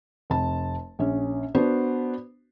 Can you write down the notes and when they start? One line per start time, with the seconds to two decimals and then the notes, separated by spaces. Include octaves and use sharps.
0.30 F1 A5
0.99 A#1 C#4
1.55 B3 D4 F#4 B4 C5